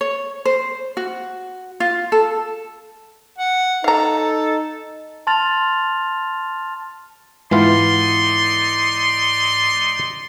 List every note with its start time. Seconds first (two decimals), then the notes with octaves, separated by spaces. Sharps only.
0.01 C#5
0.45 C5
0.97 F#4
1.80 F4
2.12 A4
3.38 F#5
3.84 D#4 A4 F5 A#5
5.27 A5 C6 F6 A6 F7
7.51 G#2 E3 B3 D#4 F4 D5 C6